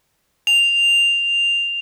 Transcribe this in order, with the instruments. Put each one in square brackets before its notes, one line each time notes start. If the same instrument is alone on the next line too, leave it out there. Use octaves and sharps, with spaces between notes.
[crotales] F7